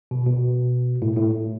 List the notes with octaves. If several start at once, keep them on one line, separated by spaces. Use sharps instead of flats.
B2
B2
A2
A2